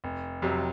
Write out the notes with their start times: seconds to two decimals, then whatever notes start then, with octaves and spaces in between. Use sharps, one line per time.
0.04 F1
0.42 F2 C3 F#3